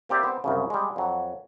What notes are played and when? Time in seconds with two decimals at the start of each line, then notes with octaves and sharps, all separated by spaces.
0.09 A#3 C4 G4 D5 E5
0.23 B3 C4
0.44 C2 F#2 C#3
0.70 G3 G#3
0.96 F2 F#3